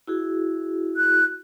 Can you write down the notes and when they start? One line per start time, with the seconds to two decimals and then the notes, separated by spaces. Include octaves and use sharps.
0.07 E4 F#4 G#4
0.97 F#6